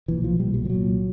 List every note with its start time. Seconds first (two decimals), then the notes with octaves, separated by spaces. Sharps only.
0.08 B1 A#2 E3
0.24 F3
0.39 B1 A#2 G3
0.54 G3
0.65 F3
0.69 C2 A#2 F#3